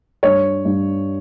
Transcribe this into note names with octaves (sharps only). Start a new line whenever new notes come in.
G2 C#5
G2